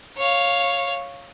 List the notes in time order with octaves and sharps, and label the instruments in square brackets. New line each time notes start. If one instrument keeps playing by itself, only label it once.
[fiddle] C#5 F5